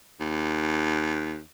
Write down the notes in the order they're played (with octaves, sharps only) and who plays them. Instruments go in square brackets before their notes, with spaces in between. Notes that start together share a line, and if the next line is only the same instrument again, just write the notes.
[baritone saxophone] D#2